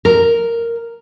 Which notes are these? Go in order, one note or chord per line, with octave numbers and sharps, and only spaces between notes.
A#4